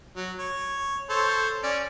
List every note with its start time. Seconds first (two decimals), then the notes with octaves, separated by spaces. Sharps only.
0.16 F#3
0.39 C#5
1.10 A4 C5 C#5
1.63 C#4 D5